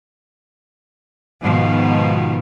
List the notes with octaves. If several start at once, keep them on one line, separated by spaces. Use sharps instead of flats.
G#2 B2 D#3 F3